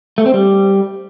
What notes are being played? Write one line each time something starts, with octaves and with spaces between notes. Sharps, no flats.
A3
C4
G3